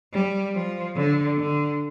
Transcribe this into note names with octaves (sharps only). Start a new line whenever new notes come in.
G3
F3
D3
D3